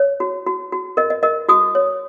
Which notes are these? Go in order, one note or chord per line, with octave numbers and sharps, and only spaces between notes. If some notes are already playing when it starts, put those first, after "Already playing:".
Already playing: C#5
F#4
F#4
F#4
A#4 D#5
D#5
A#4 D#5
F#4 D#6
C#5